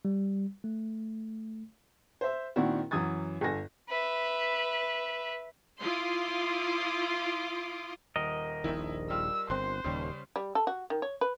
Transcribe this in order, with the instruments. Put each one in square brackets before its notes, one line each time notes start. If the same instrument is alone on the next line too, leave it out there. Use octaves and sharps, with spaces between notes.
[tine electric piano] G3
A3
[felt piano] C5 E5
A#2 D#3 C4 D4 E4 F#4
F#2 E3 F#3 D#6 G#6 A6
G1 A4 G#5 A#6
[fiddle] B4 E5
[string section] E4 F4 C6 D6 D#6
[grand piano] D#1 [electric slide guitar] A#4 D#5
[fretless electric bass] D#1 A#1 D#3 [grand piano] E4 E5
[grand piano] G3 F4 F6 [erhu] E6
[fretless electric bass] G1 C4 [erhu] C5 [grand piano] C6 F#6
[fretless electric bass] D#1 D#2 [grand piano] C#3 G3 C#4
[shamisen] G3
A4
F#4
D#3
C#5
B4